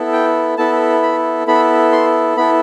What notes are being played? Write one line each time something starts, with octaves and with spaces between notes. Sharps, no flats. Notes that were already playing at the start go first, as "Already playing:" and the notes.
Already playing: B3 E4 A4
G5
B3 E4 A4 A5
B5
B3 E4 A4 B5
C6
B3 E4 A4 B5